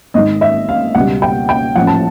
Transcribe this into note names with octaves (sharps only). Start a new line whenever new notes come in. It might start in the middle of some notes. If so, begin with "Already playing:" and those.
G#1 G#2 D#3 G#3 D#5
E5
F5
C#2 B2 G3 F#5
G5
G5
A1 A2 F3 F#5
A5